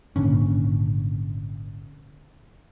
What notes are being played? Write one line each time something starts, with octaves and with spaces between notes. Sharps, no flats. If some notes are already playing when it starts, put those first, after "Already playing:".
G#1 A#2 D3 C#4